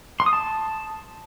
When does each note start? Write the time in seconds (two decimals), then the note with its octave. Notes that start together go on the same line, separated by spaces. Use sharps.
0.20 C6
0.26 D#6
0.33 A5